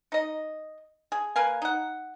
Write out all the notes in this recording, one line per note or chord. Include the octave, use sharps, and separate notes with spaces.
D#4 D#5
G#4
A#3 B4 F5 G#5
D#4 F#5